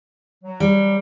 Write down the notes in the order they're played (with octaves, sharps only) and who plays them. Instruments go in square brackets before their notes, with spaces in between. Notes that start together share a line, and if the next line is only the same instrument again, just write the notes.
[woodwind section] F#3
[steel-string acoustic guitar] G3